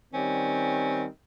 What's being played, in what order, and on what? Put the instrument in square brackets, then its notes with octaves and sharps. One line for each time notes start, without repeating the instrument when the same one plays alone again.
[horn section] D#3 G3 C4 [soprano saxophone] C#4